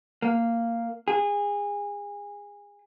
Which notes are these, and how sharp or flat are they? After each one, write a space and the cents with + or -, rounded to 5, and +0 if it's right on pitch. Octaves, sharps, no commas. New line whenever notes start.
A#3 -10
G#4 -25